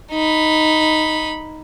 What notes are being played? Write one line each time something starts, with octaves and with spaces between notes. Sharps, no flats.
D#4 B5